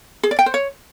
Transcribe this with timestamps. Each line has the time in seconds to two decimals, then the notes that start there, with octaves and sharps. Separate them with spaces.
0.23 G#4
0.31 D5
0.39 G5
0.46 C5
0.54 C#5